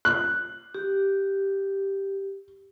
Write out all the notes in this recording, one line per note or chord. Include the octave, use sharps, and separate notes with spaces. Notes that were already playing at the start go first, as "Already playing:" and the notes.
F#6
G4